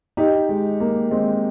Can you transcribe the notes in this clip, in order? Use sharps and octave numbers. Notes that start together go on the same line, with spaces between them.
D#4 G4
G#3
A#3
G#3 C4